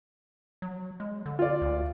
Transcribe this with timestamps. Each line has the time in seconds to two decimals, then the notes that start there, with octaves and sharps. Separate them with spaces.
0.62 F#3
1.00 G#3
1.26 D3
1.39 F4 D5
1.62 D2